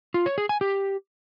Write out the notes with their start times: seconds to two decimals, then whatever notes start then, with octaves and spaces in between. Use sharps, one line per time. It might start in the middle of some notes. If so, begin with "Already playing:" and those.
0.14 F4
0.26 C#5
0.38 G#4
0.49 G#5
0.61 G4